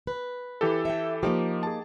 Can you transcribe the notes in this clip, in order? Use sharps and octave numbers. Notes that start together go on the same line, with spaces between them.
B4
E3 G4 A4
E5 G5
F3 A#3 D#4 G4
G#4 A5